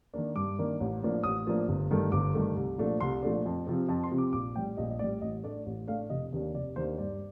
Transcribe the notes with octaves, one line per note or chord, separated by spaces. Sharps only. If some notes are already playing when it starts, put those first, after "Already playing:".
D#3 A#3 D4
G2 D6
D#3 A#3 D4
A1
A2 F3 A#3 D4
A1 D#6
A2 F3 A#3 D4
G1
G2 D#3 A3
G1 D6
G2 D#3 A3
C2
A#2 F3 A3 D4
C2 C6
A#2 F3 A3 D4
F2
C3 F3 C4
F2 A5
C6
C3 F3 C4
D6
A#1 D6
A2 G3 G5
A#1 D#5
D#5
A2 G3 D5
A1 D#5
A2 A3 D4 D5
A1
A2 A3 D4 F5
F1 D#5
D#2 D#3 A#3 D4
F1 D5
D#2 D#3 A#3 D4 C5
G2 D5